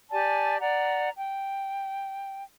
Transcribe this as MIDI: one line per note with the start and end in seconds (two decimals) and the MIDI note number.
0.11 0.58 67
0.11 0.58 74
0.11 0.58 80
0.11 0.58 81
0.61 1.10 74
0.61 1.10 78
0.61 1.10 82
1.17 2.44 79